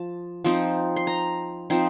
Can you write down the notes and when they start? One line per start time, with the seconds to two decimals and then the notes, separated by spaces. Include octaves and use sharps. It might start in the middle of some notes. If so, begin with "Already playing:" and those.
Already playing: F3 A5
0.44 F3 C4 D#4
0.96 C6
1.07 A#5
1.70 F3 C4 D#4 C6